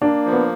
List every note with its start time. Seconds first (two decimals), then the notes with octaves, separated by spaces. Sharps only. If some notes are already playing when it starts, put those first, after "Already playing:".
0.02 A#3 D4
0.26 F3
0.33 B3